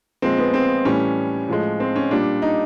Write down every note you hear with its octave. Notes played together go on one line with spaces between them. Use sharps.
A#2 F3 G#3 C4
B3
C4
A2 E3 G3 C#4
A2 F3 G#3
C4
C#4
A#2 G3 D4
D#4